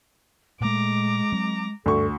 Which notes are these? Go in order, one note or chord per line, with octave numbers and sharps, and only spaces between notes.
A#2 G#3 A3 A#5 D6
F#3 C4
D2 G2 A4 C#6